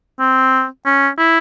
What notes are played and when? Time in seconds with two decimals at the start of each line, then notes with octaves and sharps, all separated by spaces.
0.19 C4
0.85 C#4
1.18 E4